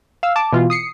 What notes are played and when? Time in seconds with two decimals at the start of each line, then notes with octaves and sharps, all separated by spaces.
0.23 F5 E6
0.36 A5 D6
0.53 B2 E3 F4
0.70 D#6 C7 C#7